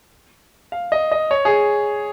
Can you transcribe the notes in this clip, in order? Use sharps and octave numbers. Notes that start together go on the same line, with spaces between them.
F5
D#5
D#5
C#5
G#4